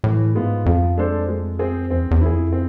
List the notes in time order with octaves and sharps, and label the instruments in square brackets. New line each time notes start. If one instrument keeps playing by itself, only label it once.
[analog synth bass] A2 [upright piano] E3
[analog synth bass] G#2 [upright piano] G#3 B3 F4
[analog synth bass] F2 [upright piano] F3
[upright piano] G#3 D4 A4 C5
G#3
C4 G#4 C5
[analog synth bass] E2 [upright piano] C4
[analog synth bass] E2
[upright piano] E4 G#4
[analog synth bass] F2
[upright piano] C4